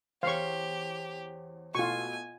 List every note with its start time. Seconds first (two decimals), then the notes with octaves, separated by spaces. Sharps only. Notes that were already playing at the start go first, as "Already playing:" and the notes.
0.23 E2 G4 C5 C#5 F5 C#6
1.75 B2 A3 E4 F4 G#5 C#6